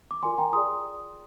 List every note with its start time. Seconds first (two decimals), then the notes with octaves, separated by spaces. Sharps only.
0.11 D6
0.23 F4 A#4 D5 G#5 C6
0.38 G5 A#5
0.53 F4 G#4 D5 C6 D#6